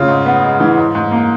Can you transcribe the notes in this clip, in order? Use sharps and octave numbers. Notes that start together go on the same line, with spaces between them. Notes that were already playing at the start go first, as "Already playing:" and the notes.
Already playing: C#3 F4
G#2
B3
G#3
E3
G#2
G#2
A#3